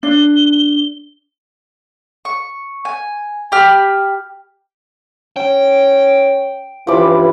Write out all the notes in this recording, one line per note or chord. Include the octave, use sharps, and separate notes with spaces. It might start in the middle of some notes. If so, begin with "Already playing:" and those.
D4 G7
C#6
G#5
G4 B5 F6
C#4 G5
C#2 G2 E3 F3 B5 D6